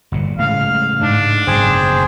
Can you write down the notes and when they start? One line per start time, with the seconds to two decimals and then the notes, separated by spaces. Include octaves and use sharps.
0.12 G1 A#2
0.39 A2 C#3 G#3 F5
1.01 G#2 G#3 D4
1.47 F#1 G#2 B2 G#4 C5 G5